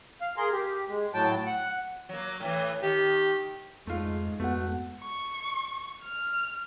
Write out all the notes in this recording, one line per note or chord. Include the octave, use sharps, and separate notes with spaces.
F5
G#4 A#4 C6
G4
G#3
A2 F#3 G5 A5
F#5
F#3 A#3
A2 E3
D#3 G4
F2 G#2 G#3 A3 F4
F2 A3 B3 F#4 F#5
C#6
F6